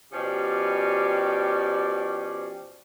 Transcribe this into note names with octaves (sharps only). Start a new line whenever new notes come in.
B2 F3 C#4 G4 D5